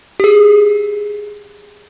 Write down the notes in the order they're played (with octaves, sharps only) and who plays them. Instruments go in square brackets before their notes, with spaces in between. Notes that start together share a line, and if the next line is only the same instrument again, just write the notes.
[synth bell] G4 G#4